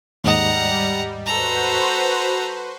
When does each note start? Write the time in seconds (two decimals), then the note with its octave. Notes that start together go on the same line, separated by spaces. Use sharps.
0.24 D#2 G#2 G3 D#5 F#5 A#5
1.26 F#4 A4 B4 C5 A#5